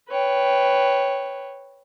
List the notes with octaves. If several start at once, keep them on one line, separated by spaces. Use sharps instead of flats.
B4 C#5 G5